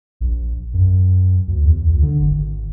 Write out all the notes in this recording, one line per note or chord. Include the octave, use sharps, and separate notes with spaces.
A#1
F#2
D2
E2
C#2
D3
G#1